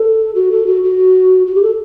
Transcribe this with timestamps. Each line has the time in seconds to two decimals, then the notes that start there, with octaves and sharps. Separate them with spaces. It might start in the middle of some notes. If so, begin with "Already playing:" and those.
Already playing: A4
0.35 F#4
0.52 A4
0.67 F#4
0.83 F#4
1.47 F#4
1.55 G4
1.63 A4